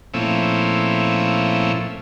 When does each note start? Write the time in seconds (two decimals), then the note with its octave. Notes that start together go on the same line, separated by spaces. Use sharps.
0.14 A#2 F3 A3 C4 C#4 E4